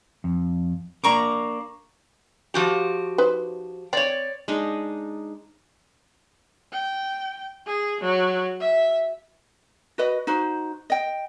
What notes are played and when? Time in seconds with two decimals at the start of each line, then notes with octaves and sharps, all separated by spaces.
0.24 F2
1.04 A#3 D4 A#4 A#5 C#6 D6
2.54 F3 F#4 G4
3.18 D#4 B4 C5
3.93 C4 C#5 D5
4.48 G#3 D4 D#4
6.73 G5
7.67 G#4
8.01 F#3
8.60 E5
9.98 F#4 B4 D#5
10.27 D#4 F#4 C5
10.90 D#5 G5